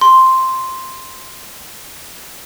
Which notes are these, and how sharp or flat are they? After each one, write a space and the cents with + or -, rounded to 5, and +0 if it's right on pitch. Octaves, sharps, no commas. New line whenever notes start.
C6 +0